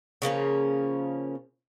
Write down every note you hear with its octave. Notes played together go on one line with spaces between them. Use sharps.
C#3 F3 A#3 C#4